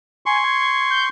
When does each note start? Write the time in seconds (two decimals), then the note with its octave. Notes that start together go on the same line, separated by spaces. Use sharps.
0.26 G#5 C6 C#6
0.44 G#6
0.91 G6